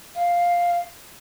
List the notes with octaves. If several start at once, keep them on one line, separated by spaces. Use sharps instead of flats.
F5